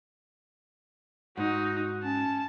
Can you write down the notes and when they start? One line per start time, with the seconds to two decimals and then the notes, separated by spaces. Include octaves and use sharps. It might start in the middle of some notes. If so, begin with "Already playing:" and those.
1.37 G#2 D#4 F#4
2.03 C#4 A5